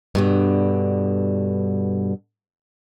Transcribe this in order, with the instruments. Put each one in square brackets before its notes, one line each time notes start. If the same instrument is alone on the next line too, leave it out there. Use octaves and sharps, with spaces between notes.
[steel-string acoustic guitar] G2 B2 D3